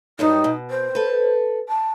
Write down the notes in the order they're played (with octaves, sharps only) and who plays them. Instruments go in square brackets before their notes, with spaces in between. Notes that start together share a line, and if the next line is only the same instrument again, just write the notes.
[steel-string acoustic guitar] G2 F#3 G3 [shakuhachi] D#4
[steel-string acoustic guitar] B2
[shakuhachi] C5
[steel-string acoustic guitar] A4 B4
[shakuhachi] A5